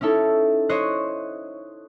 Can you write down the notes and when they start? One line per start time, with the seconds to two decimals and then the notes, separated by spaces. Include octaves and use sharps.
0.01 C#4 D#4 E4 A4
0.69 C5 C#5 D#5 F#6